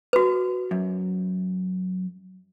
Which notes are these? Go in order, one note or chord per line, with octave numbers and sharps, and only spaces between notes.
F#4 B4
F#2